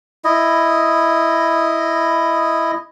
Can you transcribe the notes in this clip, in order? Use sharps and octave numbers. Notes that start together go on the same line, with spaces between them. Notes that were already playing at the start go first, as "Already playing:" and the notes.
E4 D#5